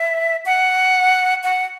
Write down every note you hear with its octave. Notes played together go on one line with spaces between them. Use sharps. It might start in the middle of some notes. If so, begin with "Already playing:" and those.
Already playing: E5
F#5
F#5